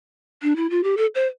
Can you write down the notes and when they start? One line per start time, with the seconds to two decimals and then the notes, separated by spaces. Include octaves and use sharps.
0.43 D4
0.56 E4
0.70 F4
0.83 G4
0.97 A4
1.15 C5